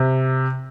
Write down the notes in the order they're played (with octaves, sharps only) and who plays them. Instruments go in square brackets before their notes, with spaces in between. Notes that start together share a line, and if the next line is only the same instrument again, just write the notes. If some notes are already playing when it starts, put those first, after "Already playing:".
Already playing: [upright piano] C3